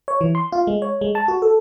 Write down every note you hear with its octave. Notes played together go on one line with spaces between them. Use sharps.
C#5
E3
C6
F4
G#3
C#5
G#3
A5
F#4
A4